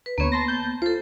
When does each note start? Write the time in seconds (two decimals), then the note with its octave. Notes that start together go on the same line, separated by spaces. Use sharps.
0.06 B4
0.18 D2 A#3 B3 C#5
0.32 A5 C6 A#6
0.48 A5 G6
0.82 F4 A4 C5